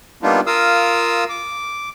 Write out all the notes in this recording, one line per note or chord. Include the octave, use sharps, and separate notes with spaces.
G3 A#3 B3 D4 D#4 F4
F4 A#4 F5 D#6 E6
D6